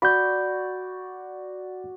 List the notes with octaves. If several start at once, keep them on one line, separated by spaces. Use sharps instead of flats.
F#4 D5 B5 G6